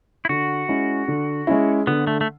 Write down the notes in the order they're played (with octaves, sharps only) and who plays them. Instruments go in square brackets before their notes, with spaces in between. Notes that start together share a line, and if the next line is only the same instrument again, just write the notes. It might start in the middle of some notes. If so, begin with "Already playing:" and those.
[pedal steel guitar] E4
[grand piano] D3 [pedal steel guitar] F#4
[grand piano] G#3 C#4 E4
D3
G#3 C#4 E4
[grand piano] D3 [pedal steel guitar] B3
[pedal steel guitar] A3
A3